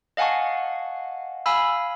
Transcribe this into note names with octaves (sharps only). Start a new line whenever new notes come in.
D#5 F5 F#5 G#5 A5 C#6
F5 G#5 B5 E6